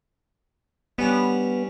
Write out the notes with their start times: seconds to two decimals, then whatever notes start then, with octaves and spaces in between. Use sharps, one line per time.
0.98 G3 B3 C#4 D4